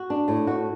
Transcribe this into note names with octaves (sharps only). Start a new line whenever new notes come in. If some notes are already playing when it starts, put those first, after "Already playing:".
Already playing: F#4
D4
A2
F#4